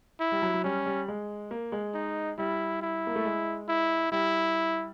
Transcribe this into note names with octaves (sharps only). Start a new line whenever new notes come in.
E4
G3
F#3
F#3
G3 C#4
G3
G#3
A#3
G#3
D#4
G3 E4
E4
A#3
A3
G#3
E4
G3 E4